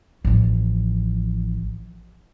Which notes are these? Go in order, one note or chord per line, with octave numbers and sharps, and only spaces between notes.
A1 F3